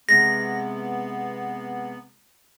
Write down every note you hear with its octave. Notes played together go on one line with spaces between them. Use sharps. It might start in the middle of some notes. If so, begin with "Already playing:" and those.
C3 G#3 B3 A#6